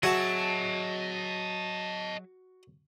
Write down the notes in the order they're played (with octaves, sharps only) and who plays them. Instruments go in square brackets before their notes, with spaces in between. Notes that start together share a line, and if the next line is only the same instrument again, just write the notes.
[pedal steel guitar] F#3 G#4 E5 [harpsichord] F#4 [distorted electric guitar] D#5 A5